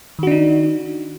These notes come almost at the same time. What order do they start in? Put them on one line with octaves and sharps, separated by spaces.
D#3 F#4 D4 D#4